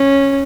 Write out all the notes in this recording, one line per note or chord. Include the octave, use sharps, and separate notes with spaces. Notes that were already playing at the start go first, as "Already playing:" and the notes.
Already playing: C#4